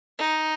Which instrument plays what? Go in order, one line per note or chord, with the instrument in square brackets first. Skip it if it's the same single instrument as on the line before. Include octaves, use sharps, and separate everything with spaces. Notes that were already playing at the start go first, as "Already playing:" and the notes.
[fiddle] D#4